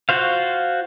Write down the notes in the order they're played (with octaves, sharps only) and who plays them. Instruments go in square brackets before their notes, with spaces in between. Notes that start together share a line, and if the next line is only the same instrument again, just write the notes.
[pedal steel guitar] F4 F#4 C5 F5